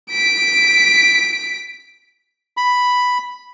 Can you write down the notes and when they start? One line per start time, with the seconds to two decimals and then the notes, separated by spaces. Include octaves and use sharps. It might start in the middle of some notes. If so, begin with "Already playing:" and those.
0.11 B6 D7
2.57 B5